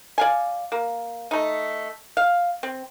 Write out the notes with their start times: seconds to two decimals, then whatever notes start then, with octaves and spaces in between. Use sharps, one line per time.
0.18 D5 F5 G#5
0.72 A#3
1.31 A3 D#4
2.17 F5
2.63 C4